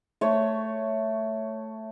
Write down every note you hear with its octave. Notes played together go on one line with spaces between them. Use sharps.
A3 C#5